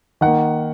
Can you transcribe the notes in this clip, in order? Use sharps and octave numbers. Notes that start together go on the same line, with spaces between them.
D#3 A#3 F#5